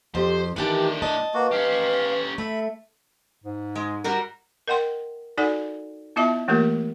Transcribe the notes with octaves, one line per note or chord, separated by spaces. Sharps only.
F2 G4 C5
A2 D#3 E3 D4 G4 A5
D#5 A5
A#3 F#4 B4
C#4 G4 F5
A3 E5 B5
G#2
G#3
G3 F#4 A#4
A#4 D#5 F#5 G5 C6
D#4 F#4 A4 D5 F#5 G#5
B3 E4 F4 D#5 E5 A5
E3 A3 A#3 F4 G4 A#4